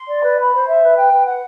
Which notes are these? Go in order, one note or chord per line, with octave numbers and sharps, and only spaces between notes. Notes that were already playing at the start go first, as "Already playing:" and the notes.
Already playing: C6
D5
B4
B5
C5
E5
B4
G5
B4
F#5